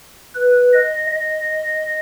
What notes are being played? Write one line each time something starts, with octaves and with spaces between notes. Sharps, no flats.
B4
D#5
D#5